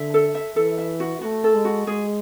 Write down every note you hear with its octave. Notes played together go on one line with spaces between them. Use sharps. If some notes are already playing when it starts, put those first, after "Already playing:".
Already playing: D3 E5
A4
E5
E3 A4
E5
F#4
A3 F#4
A4
G#3
F#4
G#3 G#4